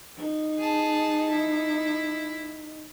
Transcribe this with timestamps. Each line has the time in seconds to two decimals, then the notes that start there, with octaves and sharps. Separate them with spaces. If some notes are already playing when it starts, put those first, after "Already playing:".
0.17 D#4
0.58 G#4 A5
1.30 E4